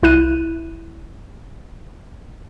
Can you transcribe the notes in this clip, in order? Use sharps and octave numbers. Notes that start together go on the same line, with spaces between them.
C2 E4 F#6 D#7